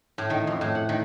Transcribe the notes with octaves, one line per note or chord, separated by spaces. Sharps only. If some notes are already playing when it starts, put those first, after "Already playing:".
A2
D#3
F2
A2
F#5
D#3